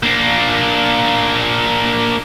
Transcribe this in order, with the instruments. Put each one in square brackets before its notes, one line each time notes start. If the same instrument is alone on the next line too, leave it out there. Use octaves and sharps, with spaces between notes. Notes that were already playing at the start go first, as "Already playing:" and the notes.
[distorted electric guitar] A#3 D4